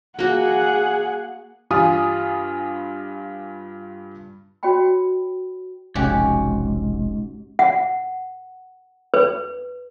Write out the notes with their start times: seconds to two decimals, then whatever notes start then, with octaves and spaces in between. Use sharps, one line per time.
0.19 A#3 F#4 G#4 F#5
1.71 G2 G3 F4 G#5 D#6
4.63 F#4 C#5 D#5 G5 B5
5.95 E1 A#1 G#2 C3 C#4 F#4 G4
7.59 F#5
9.14 B4